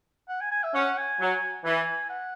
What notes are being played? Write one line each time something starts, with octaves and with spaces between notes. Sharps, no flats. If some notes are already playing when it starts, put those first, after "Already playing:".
F#5
G#5
G#5
E5
C#4 F#5
G#5
F#3
E3 G#5
F#5